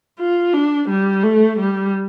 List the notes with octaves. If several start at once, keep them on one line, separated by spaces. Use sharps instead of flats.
F4
D4
G3
A3
G3